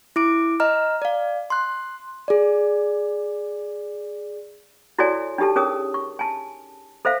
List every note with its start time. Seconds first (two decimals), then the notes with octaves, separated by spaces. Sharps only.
0.16 E4 D6 D7
0.60 D#5 A#5 F6
1.02 D5 F5
1.50 C6 F#6
2.28 G#4 D5
4.98 E4 F#4 A4 C#5 D5 G#5
5.38 D4 D#4 G4 A4 A5
5.56 C#4 G#4 A#4 C#5 D#6
5.94 C#6
6.19 G#5 A5
7.05 A4 C5 E5 F5